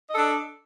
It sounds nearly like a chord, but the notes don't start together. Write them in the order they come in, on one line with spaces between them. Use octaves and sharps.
D#5 A4 D4